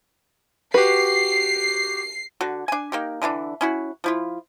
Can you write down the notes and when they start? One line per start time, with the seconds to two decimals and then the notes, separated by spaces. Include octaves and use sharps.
0.74 F#4 G4 B4 C7
2.41 D3 F#4
2.68 D4 G#5
2.92 A#3 D#4 G4
3.22 D3 E3 B3 D4
3.61 C#4 E4 F#4
4.04 F3 E4 F4